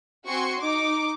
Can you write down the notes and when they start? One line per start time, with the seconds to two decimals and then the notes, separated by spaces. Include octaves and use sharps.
0.28 C4 F#4 G#5 C6 C#6 C#7
0.60 D#4 D6